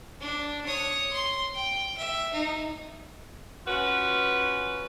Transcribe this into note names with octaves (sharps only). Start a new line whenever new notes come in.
D4
C#5 D#6
C6
G5
E5
D#4
C#4 F4 F#4 B4